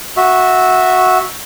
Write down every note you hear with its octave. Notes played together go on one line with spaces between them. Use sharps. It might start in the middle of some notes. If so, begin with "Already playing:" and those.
F#4 E5